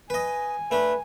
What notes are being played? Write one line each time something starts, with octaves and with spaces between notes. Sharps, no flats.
B4 D#5 G#5
A3 D4 B4